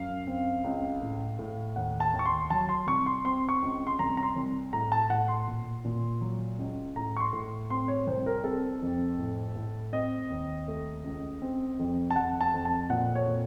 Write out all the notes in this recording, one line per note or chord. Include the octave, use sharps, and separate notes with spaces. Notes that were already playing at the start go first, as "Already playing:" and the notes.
Already playing: F#2 F5
C4
C#2
A2
A2
D#2 F#5
A5
D#2
C#6
C6
F#3 A5
C6
C2 C#6
C6
C4 C6
C#6
C#2
C6
C2 A#5
A#5
C6
C2
A2 A#5
A5
A2 F#5
C6
A#2
A#2
F#3
C#2
A2 A#5
C#6
C6
A2
C4 C6
C#5
C2 C5
A#4
C4 A4
F2
A2
A2
C4 D#5
D#2
A3
C#2
C4
F2
A5
F2 F#5
A5
F2
A5
A#2 F#5
C#5
A#2